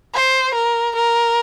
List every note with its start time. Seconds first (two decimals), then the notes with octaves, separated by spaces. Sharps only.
0.14 C5
0.54 A#4
0.96 A#4